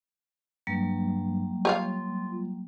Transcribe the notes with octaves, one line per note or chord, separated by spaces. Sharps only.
G2 F#3 G3 A#3
F4 G4 C#5 F5